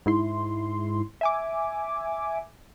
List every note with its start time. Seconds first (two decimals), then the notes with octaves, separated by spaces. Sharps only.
0.06 G#2 E4 C6
1.21 E5 G#5 D6